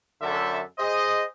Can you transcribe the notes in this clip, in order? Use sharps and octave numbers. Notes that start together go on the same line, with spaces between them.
F#2 D3 A4 E5
G#4 C5 D#5